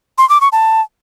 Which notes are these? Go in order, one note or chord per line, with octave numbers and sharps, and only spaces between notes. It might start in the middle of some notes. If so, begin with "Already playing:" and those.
C6
D6
C#6
A5